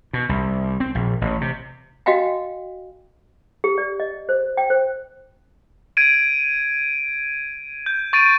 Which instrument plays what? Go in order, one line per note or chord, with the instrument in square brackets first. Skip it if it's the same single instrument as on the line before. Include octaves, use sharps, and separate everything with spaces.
[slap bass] B2
C2
C4
A#1
A1
C3
[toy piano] F#4 D#5 F5 G5 G#5
G4
D5
D#5
C5
G5
C5
[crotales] G#6 D7 D#7
G6
C#6 A6 D7 D#7